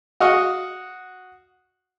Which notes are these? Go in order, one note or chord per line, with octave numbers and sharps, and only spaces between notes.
F#4 D#5 F5 C#6